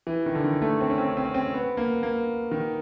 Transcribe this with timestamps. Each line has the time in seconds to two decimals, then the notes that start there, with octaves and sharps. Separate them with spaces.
0.07 E3
0.26 D#3
0.35 D3
0.44 D#3
0.62 A3
0.80 C4
0.90 C#4
0.98 C4
1.08 C#4
1.17 C4
1.25 C#4
1.34 C4
1.54 B3
1.77 A#3
2.03 A#3
2.51 D#3